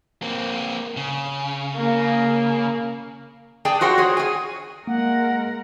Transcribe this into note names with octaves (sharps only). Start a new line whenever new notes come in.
A#3 C4
C#3
A#3
G#4 D5 G5 A5
F4 F#4 C5 F#5 G5
F#4 G#4 C#5
G#4 G#5
G#3 A#3 A#4 F#5